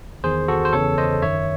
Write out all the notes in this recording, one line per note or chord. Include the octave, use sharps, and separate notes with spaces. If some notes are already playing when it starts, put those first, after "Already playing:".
E2 D#3 G#4 C5
F#4 A4
C5
E2 C#3 E3 A4 C#5
C5 D#5
F#2 D#3 C#5 E5